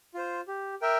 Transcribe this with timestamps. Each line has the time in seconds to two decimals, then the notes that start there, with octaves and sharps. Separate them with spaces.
0.14 F4 C5
0.48 G4
0.81 A#4 E5 G5